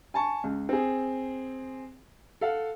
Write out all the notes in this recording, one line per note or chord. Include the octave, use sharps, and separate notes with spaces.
G#5 A5 C#6
C#2
C4 G#4
A4 F5 F#5